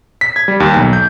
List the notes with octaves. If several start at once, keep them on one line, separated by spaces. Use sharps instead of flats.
B6
G#6
G3
D#2
B1
G6